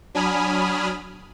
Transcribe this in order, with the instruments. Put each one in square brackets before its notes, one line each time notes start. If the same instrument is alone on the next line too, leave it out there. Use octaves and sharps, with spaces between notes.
[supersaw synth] F#3 D4 G#5 B5 D#6 F6